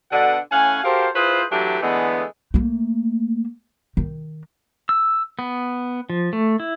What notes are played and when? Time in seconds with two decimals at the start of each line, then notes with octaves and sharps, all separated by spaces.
0.11 B2 D3 F#5
0.51 A2 C#4 F5 F#5 G#5
0.83 F#4 G4 A4 A#4 C5 F5
1.15 E4 F4 G#4 B4 C5
1.50 E3 F#3 A3 D4 G4
1.82 D3 E3 G#3 A3 B3
2.54 A3 A#3
3.97 D#3
4.89 E6
5.39 B3
6.10 F3
6.33 A3
6.60 E4